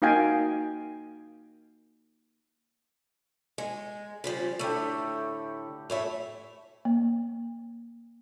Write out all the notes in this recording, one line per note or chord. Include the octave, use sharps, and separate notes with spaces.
A#3 D#4 F#4 F5 G5 G#5
G#3
C#3 F3 G3
A2 D3 A3 G4
A2 C#5 E5
A#3